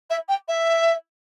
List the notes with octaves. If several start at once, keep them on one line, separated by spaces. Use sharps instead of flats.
E5
G5
E5